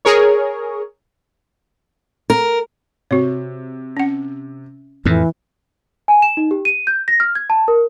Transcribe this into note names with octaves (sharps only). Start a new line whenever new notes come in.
G#4 A#4 C#5
A#4
C3 F#4 C#5
C#4 F#5
F2 A2 E3
G#5
E7
D#4
G4
D#7
G6
A#6
F6
G#6
A5
A#4